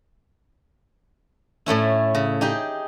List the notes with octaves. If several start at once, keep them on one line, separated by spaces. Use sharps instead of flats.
A2 A3 C#4 E4
C#3
D#4 G4 G#4